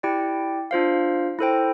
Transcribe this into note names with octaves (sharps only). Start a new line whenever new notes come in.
E4 G4 D5 G5
D4 F4 C5 F5
E4 A4 C5 G5